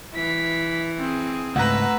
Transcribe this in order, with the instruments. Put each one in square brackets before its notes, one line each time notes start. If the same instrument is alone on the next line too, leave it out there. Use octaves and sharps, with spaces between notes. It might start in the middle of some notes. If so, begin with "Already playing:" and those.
[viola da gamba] E3 [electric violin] B6
[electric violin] C4 G#4
[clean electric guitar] C#2 G#2 [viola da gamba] A3 B4 [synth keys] F#5 A#5 [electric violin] E6